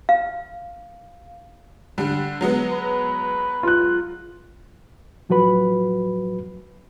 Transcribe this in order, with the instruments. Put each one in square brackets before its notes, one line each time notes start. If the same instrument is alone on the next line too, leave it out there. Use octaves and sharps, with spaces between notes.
[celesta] F5
[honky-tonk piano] D3 G3
F#3 G#3 B3
[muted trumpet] B4
[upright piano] F4 F#6
[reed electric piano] A2 F3 F#3 F#4 B4 B5